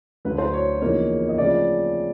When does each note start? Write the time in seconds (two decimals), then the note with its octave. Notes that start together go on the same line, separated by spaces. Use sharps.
0.25 D2 D3 F#3 B4
0.38 C5
0.53 C#5
0.81 E2 C#3 F3 A#3 D#4 C#5
1.29 D#5
1.38 C#3 F3 A3 C4 D5